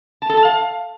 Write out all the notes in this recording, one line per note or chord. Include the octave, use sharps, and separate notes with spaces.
A5
A4
A5
F5